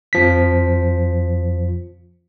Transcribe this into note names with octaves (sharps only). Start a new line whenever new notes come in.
F2 F3 B6